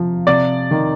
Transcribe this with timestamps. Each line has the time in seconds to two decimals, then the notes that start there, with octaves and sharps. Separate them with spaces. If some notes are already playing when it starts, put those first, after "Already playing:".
Already playing: C3 F3
0.27 C3 D5
0.71 D#3